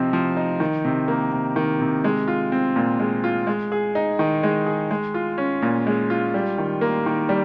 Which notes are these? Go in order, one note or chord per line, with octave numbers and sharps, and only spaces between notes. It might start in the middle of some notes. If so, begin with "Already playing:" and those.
Already playing: C3 F3 C4 D#4
F3
D#4
D#3
C3
A#3
C3
D#3
C3
G#3
F4
C4
A#2
G#3
F4
G#3
G#4
D#4
D#3
G#3
G#4
G#3
F4
C#4
A#2
G#3
F4
G3
D#3
A#3
D#3
G3